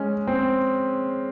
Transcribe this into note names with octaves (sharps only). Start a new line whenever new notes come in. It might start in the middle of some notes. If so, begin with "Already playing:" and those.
Already playing: G#3 C#4
C4